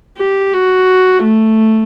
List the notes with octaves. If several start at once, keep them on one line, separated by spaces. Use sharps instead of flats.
G4
F#4
A3